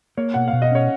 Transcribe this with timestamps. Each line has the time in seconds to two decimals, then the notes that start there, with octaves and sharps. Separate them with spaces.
0.17 A#3 C#5
0.34 B2 F#5
0.48 F5
0.53 B2
0.62 D#5
0.71 C#4 C#5